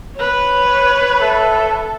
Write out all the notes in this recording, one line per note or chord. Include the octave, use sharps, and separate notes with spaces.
B4 C#5
A4 E5